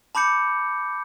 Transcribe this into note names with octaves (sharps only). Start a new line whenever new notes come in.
A5 B5 D6 G6 C#7